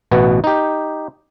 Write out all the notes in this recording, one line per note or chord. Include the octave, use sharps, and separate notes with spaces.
A1 B2 B3 F#4
D#4 G4